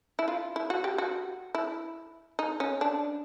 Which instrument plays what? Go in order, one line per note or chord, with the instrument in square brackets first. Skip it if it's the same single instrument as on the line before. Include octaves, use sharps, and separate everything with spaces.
[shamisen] E4
F4
E4
F#4
G4
F#4
E4
D#4
C#4
D4